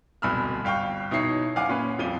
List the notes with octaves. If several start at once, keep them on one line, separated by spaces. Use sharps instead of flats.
D1 C2 B2 B5 E6 F6
G1 F5 G5 C#6
B2 D#4 E4 C#5 C7 C#7
F#1 F5 F#5 G#5 D6
A#2 C#4 B4
D#1 F2 F3 D#7 G7